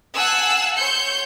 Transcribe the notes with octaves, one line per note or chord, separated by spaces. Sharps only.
F5 F#5 G#5 A5 E6 F#6
C#5 C6 G6 C#7